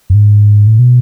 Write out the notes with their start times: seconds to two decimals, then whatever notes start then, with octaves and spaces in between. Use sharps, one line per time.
0.10 F#2
0.14 G#2
0.67 A2
0.79 B2